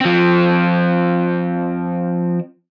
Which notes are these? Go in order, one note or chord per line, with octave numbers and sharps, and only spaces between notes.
F3 C4